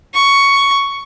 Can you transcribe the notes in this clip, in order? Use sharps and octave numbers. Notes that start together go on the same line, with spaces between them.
C#6